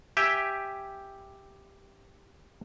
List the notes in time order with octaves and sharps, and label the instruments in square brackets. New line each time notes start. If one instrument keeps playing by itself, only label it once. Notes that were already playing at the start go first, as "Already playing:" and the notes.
[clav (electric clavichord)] G4 E5 G5 G#5